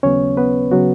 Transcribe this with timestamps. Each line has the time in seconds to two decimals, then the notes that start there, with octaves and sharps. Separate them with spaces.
0.03 D#2 C#3 F#3 B3 C#4 C#5
0.37 B3 B4
0.71 C#3 F#3 B3 F#4